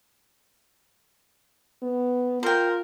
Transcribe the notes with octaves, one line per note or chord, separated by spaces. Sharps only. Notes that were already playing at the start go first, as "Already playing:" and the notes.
B3
F4 A#4 C5 G5